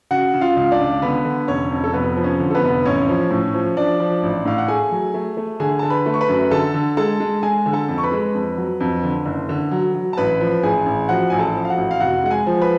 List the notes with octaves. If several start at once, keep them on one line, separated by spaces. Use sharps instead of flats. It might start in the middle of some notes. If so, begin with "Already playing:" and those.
C#3 F#4 F#5
C#3
F4 F5
C#2
D4 D5
C#2
D3 B3 B4
D3
F1 C#4 C#5
F2
A4
F1 B3 B4
F3
C#4 C#5
D3
A4
B3 B4
F1
A1 C#4 C#5
F3
A2
F3
F3 D4 D5
F3
A1
A2 F5
F#5
A3 G#4 G#5
F#3
A3
A3
D3 G#4 G#5
D3 A5
B4 B5
A3
C#6
B4 B5
F#2
D3 A4 A5
D3
G#3 A4 A5
G#3
G#3 G#4 G#5
D3
A4 A5
F2
C#6
B4 B5
G#3
F2
F#3
F2
D3
F#1
D3
F#3
F#3
A5
A1 B4 B5
F3
A1 G#4 G#5
A1
F3 F#4 F#5
A1 G#5
A4 A5
F3
F5
F#4 F#5
A1
F5
F1 F#4 F#5
G#3 F#5
G#4 G#5
F3
B4 B5